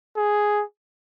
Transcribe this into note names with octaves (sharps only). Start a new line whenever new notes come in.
G#4